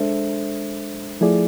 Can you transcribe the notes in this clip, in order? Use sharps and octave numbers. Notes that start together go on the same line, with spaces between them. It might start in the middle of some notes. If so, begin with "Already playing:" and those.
Already playing: G#3 D4 A4 C5 E5
F3 A3 E4 G#4 D5